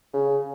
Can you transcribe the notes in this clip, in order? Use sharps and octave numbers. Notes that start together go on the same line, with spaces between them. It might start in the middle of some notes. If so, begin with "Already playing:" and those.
C#3